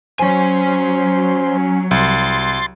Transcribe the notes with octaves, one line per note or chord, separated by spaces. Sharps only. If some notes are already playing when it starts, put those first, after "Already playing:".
F#3 C#4 C5 G#5
C2 C6 A6